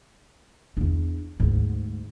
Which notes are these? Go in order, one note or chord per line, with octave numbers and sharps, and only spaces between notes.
E2 D4
D2 G#2